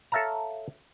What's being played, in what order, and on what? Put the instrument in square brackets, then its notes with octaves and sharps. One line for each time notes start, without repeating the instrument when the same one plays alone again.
[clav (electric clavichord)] A4 C#5 E5 F5 A5 A#5